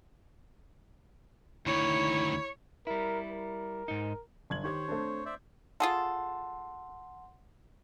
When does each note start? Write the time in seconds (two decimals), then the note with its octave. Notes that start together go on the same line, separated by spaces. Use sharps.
1.66 D2 D#3 E4 C#5
2.87 G3 E4 A#4
3.31 A#4
3.88 G#2 D#4
4.50 G1 G#6 F#7
4.63 D#3 G4 C5 C#5 G#6
4.88 A3 C4 D4
5.26 C5 D5 E5
5.80 F4 G#4 A4 F#5 C6